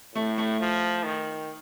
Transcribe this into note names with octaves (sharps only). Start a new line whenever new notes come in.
A2 A3
A3
F3
D#3